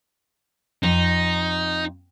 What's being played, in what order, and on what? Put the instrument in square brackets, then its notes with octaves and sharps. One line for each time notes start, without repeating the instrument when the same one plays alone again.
[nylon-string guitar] F2 [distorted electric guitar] D#4